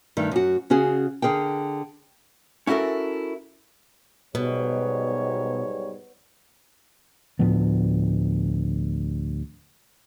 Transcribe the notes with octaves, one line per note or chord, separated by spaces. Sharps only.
G2 D#3 A3
F#2 F#4
C#3 C#4 F#4 G#4
D3 G#4 A#4 G5
C#4 E4 F#4 A4 A#4
B1 G#2 B2 G3 C#5
D2 A2 F3 B3